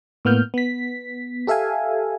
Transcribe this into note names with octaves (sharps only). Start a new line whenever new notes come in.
A2 A#3 B3 F6 G6
B3 B6
G4 A4 E5 F5 G#5